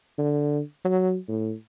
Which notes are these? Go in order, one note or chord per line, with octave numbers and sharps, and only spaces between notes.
D3
F#3
A2